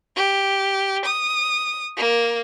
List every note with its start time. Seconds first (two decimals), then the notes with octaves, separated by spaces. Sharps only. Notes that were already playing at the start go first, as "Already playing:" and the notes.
0.16 G4
1.05 D#6
1.97 A#3